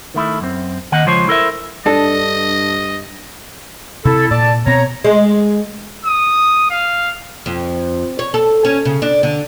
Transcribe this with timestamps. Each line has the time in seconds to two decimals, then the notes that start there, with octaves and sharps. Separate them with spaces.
0.14 D#3 A3 E4
0.40 F#2 C4
0.92 D#2 D#3 D#5 F#5
1.06 C#2 F3 C5 C#5
1.28 E4 A4 A#4 C5 E5
1.86 G2 D4 A4 D#5
4.05 C3 E4 A4
4.31 A#2 D5 A5
4.66 B2 C4 C#5 A#5
5.05 G#3
6.05 D#6
6.70 F5
7.46 F2
8.19 C#5
8.34 A4
8.65 C#4
8.85 C#3
9.02 D4
9.23 D3